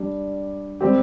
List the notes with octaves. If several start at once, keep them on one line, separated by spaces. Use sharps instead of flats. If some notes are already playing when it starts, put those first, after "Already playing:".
Already playing: G3 D4 G4
G3 C4 G4